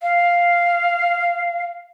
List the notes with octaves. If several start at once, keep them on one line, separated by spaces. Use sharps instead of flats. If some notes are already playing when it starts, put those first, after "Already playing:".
F5